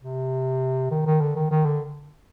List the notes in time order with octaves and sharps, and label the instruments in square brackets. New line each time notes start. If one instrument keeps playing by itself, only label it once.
[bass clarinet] C3
D#3
D#3
D3
D#3
D#3
D3